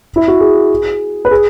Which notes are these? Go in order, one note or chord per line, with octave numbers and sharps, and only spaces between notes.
E4
F#4
G#4
B4
G#4